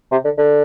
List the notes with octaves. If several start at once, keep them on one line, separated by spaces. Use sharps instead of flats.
C3
D3
D3